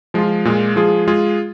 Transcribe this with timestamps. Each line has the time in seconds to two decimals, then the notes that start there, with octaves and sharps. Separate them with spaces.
0.14 F3 G#3 F4
0.45 A#2 G#3 F4
0.76 F3 G#3 F4 G#4
1.08 G#3 F4 G#4